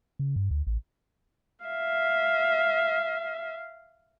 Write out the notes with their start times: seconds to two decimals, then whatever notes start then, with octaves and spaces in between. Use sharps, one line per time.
0.19 C#3
0.36 G2
0.51 D2
0.67 A1
1.65 E5 F5